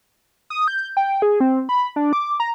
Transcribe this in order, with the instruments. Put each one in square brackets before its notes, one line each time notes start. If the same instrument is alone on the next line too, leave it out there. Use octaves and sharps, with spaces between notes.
[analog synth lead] D#6
G6
G5
G#4
C4
B5
D4
D6
A#5